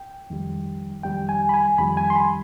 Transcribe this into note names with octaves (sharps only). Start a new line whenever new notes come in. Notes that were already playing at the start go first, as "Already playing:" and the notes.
Already playing: G5
F2 D#3 G3
F2 D#3 G3 G5
G#5
B5
G#5
F2 D#3 G3 B5
G#5
C6
B5